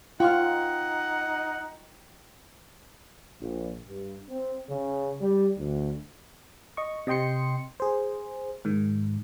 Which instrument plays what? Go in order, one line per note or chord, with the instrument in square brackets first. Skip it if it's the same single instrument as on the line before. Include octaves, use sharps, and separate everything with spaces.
[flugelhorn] D#4 [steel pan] F4 [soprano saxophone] F#5 [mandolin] G5 C#6 F6
[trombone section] A#1
G2
C4
C#3
G3
D2
[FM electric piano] D#5 C#6
C3 D#5 G5 C6 C#7
G#4 C5
G#2 D#3